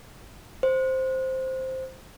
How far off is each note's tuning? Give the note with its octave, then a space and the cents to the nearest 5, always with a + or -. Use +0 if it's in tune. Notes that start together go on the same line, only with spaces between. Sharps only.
C5 +0